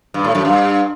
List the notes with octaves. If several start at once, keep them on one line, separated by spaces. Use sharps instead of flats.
G2
A2
F#2
G2